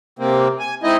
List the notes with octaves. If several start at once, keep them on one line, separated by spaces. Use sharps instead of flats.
C3 A#3 C4
G#5
G#3 C4 D#4 E4 D#5